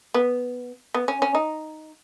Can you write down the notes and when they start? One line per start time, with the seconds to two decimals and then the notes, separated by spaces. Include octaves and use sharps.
0.14 B3
0.94 B3
1.08 C#4
1.22 C#4
1.35 D#4